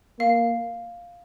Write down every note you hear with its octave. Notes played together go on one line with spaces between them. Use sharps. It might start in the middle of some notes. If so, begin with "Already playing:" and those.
A#3 F5